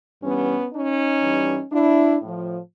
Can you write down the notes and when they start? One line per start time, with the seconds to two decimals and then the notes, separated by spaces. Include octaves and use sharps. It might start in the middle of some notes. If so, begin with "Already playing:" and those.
0.21 G2 E3 G3 B3 C#4
0.71 C#4 D#4
1.21 G2 E3 G3
1.71 D4 E4
2.22 A2 F3